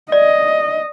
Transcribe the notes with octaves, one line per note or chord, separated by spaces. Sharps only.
D5 D#5